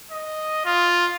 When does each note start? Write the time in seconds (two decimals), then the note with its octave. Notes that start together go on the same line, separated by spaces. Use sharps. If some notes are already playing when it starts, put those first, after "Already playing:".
0.12 D#5
0.65 F4